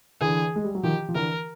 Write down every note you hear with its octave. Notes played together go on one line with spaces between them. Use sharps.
D3 E3 G#4
G#3
G3
F#3
D#3 F3 G4
F3
D3 E3 A#4